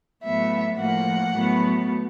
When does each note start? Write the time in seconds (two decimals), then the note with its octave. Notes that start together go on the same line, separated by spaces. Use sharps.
0.24 A2 F#3 B3 E5
0.79 A2 F3 A#3 F#5
1.34 A2 F#3 B3